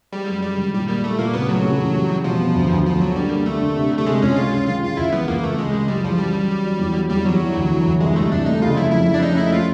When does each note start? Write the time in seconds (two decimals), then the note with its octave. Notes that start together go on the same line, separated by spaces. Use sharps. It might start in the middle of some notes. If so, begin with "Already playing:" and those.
0.12 G3 G#3
0.28 F#2
0.43 G3 G#3
0.57 D#3
0.73 A#2 G3
0.88 G3 A#3
1.03 G3 A3
1.18 A#2 A#3
1.34 C#3 B3
1.49 F#3 A3
1.64 C#3
1.78 E3
1.94 G3
2.10 G3
2.24 B2 F3
2.40 B3
2.54 D2
2.70 D2
2.85 D2 F3
3.00 D2 F#3
3.16 D3 G3
3.30 A#3
3.46 D3 A3
3.62 D3
3.76 C3
3.91 C3
3.97 A3
4.06 C3 G#3
4.22 C#2 C#4
4.36 G#3 F4
4.52 C#4
4.67 D#3 F4
4.82 G#3 F4
4.97 C#2 E4
5.12 E3 B3
5.28 C#2 A#3
5.43 C#2 A3
5.58 C#3 G#3
5.73 C#3
5.88 F#2 G3
6.04 E3 F3
6.19 F#3 G3
6.34 F#3
6.49 F#3
6.64 F#3
6.80 E2
6.95 F#3
7.10 E2 G3
7.25 E2 F#3
7.41 E3
7.55 D2
7.70 E3
7.85 D2
8.00 C2 G#3
8.16 C2 A3
8.32 C2 D4
8.46 A3 D#4
8.62 C#3 F4
8.77 F2 E4
8.92 F2 E4
9.07 F2
9.14 D4
9.22 C#4 D#4
9.37 A3 E4
9.52 A3 F4